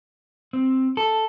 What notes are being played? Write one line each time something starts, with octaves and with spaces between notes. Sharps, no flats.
C4
A4